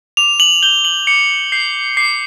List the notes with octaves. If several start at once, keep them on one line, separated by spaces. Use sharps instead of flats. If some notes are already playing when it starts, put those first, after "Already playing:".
D6 F7
F#7
G6 G7
F#7
D6 C#7
G6 C7
D6 C7